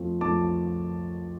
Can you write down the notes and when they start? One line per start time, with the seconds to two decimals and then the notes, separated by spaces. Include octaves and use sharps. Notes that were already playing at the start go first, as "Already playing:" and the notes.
Already playing: F2 F3 A3 C4
0.21 F2 F3 A3 C4 A5 D6